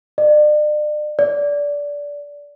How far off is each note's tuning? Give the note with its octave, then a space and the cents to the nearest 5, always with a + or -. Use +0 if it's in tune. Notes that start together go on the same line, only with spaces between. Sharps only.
D5 +40
D5 -20